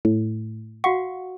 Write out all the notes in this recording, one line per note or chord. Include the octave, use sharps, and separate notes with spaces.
A2
F#4 F5 F#5 C#6